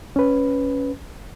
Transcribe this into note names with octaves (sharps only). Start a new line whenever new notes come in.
C#4 B4